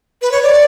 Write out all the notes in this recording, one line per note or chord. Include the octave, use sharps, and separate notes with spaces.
B4
C#5
D5